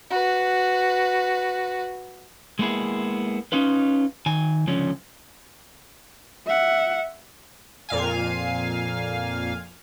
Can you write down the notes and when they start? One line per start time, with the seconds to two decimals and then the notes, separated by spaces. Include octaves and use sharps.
0.10 F#4 B4
2.59 G#3 A#3 B3 E4 G#4
3.52 C#4 D#4 F4 B4
4.26 D#3 G#5
4.67 C#2 D3 F3 C#4
6.47 E5 F#5
7.89 F2 A#2 F5 G#5